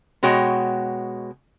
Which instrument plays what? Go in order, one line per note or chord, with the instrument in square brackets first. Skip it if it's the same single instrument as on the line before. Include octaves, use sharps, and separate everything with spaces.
[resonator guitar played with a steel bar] B2 G#3 F#4 C#5 G5